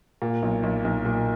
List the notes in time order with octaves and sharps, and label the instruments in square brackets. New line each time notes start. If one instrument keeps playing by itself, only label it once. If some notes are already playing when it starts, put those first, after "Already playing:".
[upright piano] A#2
B1
B1
B1
A#2